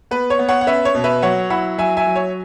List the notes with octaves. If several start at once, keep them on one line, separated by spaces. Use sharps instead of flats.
B3 B4
C#5
B3
C#5 F#5
F#5
C#4 B4 E5
C#5
B2
B4 E5
F#3 C#5 F#5
E4 F#5 B5
F#3 E5 G#5
E5 G#5
F#3
C#5